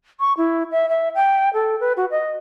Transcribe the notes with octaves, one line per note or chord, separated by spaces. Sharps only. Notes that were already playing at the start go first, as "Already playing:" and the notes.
C#6
E4
E5
E5
G5
A4
B4
F#4
D#5